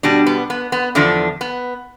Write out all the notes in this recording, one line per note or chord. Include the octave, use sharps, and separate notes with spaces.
B2 G3 D4
B3
B3
B3
E2 D3 F3 D4
B3